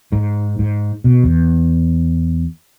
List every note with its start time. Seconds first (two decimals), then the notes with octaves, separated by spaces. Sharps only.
0.12 G#2
0.59 G#2
1.04 B2
1.24 E2